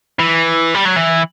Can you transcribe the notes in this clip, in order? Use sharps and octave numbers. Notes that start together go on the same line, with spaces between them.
E3
G3
F#3
E3